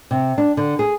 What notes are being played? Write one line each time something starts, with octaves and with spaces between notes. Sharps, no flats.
C3
D4
D3
G#4